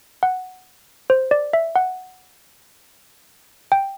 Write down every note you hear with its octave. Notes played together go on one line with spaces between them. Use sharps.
F#5
C5
D5
E5
F#5
G5